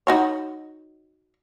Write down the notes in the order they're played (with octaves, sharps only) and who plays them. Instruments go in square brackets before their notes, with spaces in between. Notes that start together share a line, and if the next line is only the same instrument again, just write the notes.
[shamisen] D#4 F#4 C#5